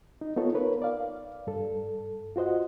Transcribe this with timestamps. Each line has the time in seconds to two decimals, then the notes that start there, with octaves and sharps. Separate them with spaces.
0.21 D#4
0.36 B3 D#4 F4 A4 C#5
0.54 A#4 B4 C#5
0.82 D5 F5
1.47 G2 A4
2.36 F4 F#4 C5 D#5 F#5